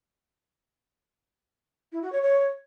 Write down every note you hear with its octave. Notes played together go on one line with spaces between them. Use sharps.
E4
F#4
C#5
C#5